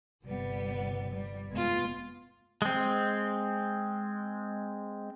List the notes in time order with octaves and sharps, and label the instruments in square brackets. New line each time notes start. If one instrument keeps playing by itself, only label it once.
[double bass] G1 C3 [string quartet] G3 B3
[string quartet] G3
[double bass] F1 B3 [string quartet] G#3 F4
[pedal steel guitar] G#3 C4